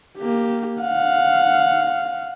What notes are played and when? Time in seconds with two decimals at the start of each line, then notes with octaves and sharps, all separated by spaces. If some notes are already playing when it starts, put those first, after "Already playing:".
0.18 A#3 G4
0.81 F5 F#5